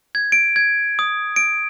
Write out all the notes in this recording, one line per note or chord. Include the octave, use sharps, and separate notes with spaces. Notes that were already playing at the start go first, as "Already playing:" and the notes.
G#6
D7
G#6
D#6
D7